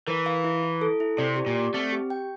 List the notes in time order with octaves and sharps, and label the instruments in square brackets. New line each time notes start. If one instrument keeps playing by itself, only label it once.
[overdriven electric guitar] E3 [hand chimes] A#4
[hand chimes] F5
E4
E4
A4
E4
[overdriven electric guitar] C3 [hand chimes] D5
[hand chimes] G4
[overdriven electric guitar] A#2
[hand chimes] D5
[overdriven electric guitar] A3 [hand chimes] C4
[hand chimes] G4
G5